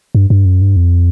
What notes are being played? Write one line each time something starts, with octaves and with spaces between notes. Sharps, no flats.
G2
G2
F#2
G2
F2